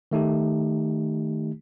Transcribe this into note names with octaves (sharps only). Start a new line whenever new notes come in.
D#3 A3 D#4 G4